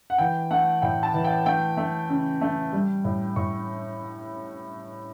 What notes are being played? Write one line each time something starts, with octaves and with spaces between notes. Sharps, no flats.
F#5
E3 G5
A3 F#5
A2 G5
A5
E3
G5
A3 G5
A3
C#3
A3
G3
A2
A2 C#6